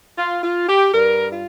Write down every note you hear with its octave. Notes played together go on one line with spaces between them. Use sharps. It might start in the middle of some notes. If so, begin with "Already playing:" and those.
F4
F4
G4
G2 G3 A#4
F4